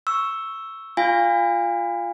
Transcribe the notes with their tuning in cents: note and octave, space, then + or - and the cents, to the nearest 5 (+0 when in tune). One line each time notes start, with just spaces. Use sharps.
C#6 +0 E6 +0
F4 +0 F5 +0 G#5 -35